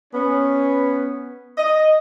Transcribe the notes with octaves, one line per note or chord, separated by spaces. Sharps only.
B3 C#4
D#5